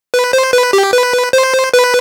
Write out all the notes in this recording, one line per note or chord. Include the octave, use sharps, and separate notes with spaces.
B4
C5
B4
G4
B4
C5
B4